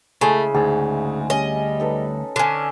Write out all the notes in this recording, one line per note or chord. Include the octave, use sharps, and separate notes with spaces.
C#3 G#3 A3 E4
D2 G#2 G#4
G3 C#4 D#5 G#5
D#4 A4 B4
D3 C#4 A4 C5